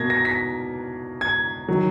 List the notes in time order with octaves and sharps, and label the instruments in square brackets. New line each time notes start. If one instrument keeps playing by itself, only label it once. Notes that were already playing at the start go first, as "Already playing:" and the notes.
Already playing: [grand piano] B2 A#3 G#6 A#6
A#6
B6
G#6
D#3 F#3